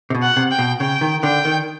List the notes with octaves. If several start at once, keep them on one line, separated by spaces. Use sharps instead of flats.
C3
B2
F#5
C3
G5
B2
C#3 G5
D#3
D3 G5
D#3